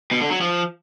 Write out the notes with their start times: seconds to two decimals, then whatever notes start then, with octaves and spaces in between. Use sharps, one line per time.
0.11 B2
0.21 D3
0.31 F#3
0.41 F3